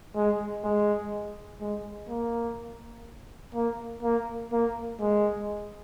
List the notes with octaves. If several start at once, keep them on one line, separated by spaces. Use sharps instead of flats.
G#3
G#3
G#3
A#3
A#3
A#3
A#3
G#3